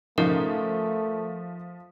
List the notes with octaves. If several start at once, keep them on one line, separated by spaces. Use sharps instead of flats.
G#2 C#3 F3 A3 D#4 A#4